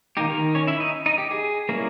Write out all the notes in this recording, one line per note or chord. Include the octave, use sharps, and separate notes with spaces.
D#3 A#3 D#4 G4
A#3 A#4
C#4 C#5
E4 E5
D#4 D#5
D#4 D#5
G4
G#4
G3 A#3 C#4 E4 A#4